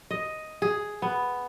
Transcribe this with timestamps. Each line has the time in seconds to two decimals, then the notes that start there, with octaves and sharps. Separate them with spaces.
0.11 D#5
0.62 G#4
1.02 B3